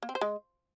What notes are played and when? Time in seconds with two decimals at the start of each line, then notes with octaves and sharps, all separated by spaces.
0.03 A#3
0.09 C4
0.15 C5
0.21 G#3